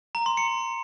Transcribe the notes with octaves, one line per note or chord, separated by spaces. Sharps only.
A#5
C6
C#7